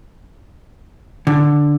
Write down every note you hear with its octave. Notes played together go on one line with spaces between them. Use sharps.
D3